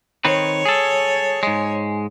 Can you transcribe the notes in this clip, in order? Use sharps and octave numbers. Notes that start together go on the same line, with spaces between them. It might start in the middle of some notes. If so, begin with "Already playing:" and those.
D#3 C4 B4 C#5
G#4 A4
G#2 G#3